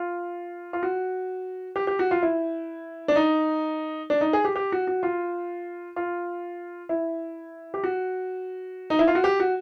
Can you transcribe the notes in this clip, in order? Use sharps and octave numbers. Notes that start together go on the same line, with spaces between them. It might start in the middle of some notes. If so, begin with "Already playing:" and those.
Already playing: F4
F4
F#4
G4
G4
F#4
F4
E4
D4
D#4
D4
D#4
G#4
G4
G4
F#4
F#4
F4
F4
E4
G4
F#4
D#4
E4
F4
F#4
G4
F#4